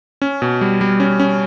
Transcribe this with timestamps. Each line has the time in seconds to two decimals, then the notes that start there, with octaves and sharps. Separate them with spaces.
0.22 C#4
0.42 B2
0.61 G3
0.81 G3
1.00 C#4
1.20 C#4